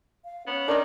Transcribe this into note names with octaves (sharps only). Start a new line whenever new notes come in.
F5
B3 C#4
D#3 D4 A#4 C#5 D#5